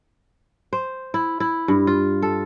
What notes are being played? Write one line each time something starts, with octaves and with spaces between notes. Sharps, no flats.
C5
E4
E4
G2
F4
A4